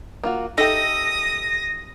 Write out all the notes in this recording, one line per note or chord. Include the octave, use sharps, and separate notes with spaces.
A#3 F4 F#4
D#4 G4 A4 E5 D#6 A#6